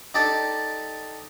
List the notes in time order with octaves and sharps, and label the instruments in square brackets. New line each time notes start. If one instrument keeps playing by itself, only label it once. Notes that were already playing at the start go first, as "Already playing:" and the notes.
[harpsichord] D#4 G4 A4 D5 A5